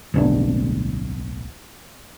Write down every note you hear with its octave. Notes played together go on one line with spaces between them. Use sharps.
D1 B1 D4